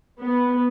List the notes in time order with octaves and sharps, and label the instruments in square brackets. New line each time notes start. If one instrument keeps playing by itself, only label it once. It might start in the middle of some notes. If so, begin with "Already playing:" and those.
[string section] B3